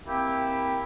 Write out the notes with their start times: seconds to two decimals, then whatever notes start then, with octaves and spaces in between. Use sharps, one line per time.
0.07 A#3 C4 E4 G4 G5